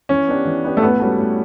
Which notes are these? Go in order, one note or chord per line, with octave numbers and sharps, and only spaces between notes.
E3 C#4
B3 D4 G4
E3
B3 D4 G4
A3
A2 B3
G3 C#4 F#4 A4
A2